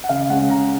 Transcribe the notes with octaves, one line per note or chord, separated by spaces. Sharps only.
F#5
C#3 F5
G#3 C#4 F#5
C#3 A#5